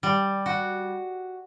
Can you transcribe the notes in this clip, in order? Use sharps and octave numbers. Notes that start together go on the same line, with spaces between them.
G3
F#4